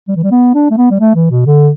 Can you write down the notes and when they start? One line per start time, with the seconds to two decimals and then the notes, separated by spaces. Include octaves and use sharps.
0.08 G3
0.16 E3
0.23 G3
0.31 B3
0.55 D4
0.71 A3
0.77 B3
0.91 G3
1.00 A3
1.15 E3
1.31 B2
1.46 D3